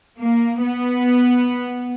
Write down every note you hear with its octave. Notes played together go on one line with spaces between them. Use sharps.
A#3
B3